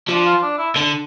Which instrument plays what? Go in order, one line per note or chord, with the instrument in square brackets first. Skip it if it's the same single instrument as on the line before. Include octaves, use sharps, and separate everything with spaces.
[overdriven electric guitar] F3 [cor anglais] D4
[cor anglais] F4
D4
E4
[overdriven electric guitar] D3